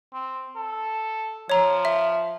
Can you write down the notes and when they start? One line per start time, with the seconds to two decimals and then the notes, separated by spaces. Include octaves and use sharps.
0.13 C4
0.56 A4
1.50 F3 C#5 A#5
1.85 E5